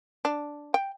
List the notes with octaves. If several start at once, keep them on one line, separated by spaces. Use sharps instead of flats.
D4
G5